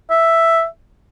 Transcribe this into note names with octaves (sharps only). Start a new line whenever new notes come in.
E5